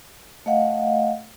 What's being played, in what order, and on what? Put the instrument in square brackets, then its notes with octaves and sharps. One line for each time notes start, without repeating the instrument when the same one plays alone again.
[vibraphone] A3 D#5 F5 F#5